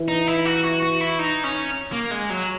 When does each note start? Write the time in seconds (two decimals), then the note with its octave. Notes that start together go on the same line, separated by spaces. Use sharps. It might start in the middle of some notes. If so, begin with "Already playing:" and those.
Already playing: E3
0.08 D#4
0.27 E4
0.45 F#4
0.64 F#4
0.82 F#4
1.01 E4
1.19 D#4
1.44 C#4
1.92 A#3
2.11 G#3
2.30 F#3